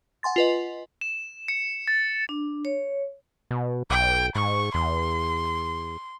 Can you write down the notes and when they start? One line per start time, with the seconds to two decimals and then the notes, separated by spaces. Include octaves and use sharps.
0.23 F#5 G#5 C6 A6
0.36 F4 B4 D#5
1.01 E7
1.48 C#7
1.88 A6
2.29 D4
2.65 C#5
3.51 B2
3.90 B1 G5
4.35 G#2 C#6
4.74 E2 C6